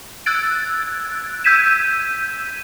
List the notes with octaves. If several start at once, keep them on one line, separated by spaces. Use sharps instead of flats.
E6 F#6 G#6 A6 D7
E6 G6 G#6 B6 D#7 E7